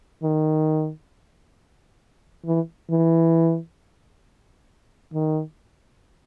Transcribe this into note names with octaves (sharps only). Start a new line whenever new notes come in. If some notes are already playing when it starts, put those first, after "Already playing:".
D#3
E3
E3
D#3